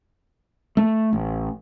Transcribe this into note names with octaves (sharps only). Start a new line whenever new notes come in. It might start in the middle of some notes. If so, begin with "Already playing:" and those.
A3
A1